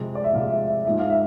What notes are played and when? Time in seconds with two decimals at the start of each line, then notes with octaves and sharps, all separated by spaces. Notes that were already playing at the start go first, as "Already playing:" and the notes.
Already playing: F2 C3 G#3
0.15 D5
0.24 E5
0.33 F2 C3 G#3 F5
0.51 E5
0.68 E5
0.85 G#2 F3 G#3 E5
0.99 F5
1.10 E5